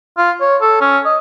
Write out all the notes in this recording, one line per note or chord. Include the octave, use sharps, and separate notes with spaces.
F4
C#5
A4
C#4
D#5